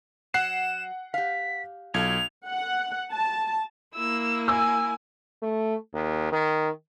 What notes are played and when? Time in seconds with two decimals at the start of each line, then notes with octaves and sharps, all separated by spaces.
0.34 F#3 F#5 F#6 C7 E7
1.14 G4 F5 B6
1.94 B1 F4 A4 A5 G#6 F7
2.47 F#5
3.12 A5
3.95 A#3 E4 E6
4.48 G#5 E6
5.42 A3
5.94 D#2
6.32 D#3